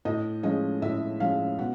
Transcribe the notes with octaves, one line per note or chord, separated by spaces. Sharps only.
A2 D#5
F3 G#3 C#4 D#5
A2 E5
F3 G#3 C#4 F5
B2 F#5